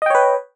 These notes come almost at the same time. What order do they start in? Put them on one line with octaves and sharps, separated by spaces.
D#5 G5 C#5 B4